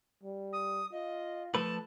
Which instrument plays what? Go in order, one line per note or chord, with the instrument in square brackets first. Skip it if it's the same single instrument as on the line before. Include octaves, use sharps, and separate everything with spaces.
[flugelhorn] G3
[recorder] D#6
[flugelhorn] F4 [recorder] D#5
[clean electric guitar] F3 A3 B4 [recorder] A5